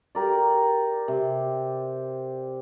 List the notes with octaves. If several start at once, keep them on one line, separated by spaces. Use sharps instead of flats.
G4 A#4 D5
C3